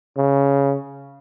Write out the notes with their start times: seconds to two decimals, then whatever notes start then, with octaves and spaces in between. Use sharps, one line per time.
0.17 C#3